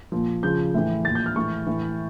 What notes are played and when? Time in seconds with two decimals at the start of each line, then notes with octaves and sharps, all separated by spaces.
0.12 A#2 F3
0.43 C#3 F3 G6
0.74 A2 E3
1.05 A#2 F3 A6
1.15 G6
1.26 F6
1.36 A2 E3 C#6
1.66 A2 E3